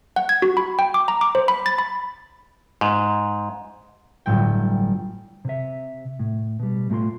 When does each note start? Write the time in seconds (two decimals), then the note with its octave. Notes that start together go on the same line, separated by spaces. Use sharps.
0.16 F#5
0.29 G#6
0.42 F#4
0.57 B5
0.79 G5
0.94 D6
1.08 A#5
1.21 D6
1.35 C5
1.48 B5
1.66 A6
1.78 B5
2.81 G#2
4.26 G1 A2 F#3 G5
5.45 C3 E5
6.19 A2
6.60 B2 G3
6.90 A2 A3 F4 A#5 C6